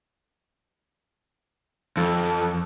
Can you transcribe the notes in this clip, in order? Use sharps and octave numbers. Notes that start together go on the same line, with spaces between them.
F2 A4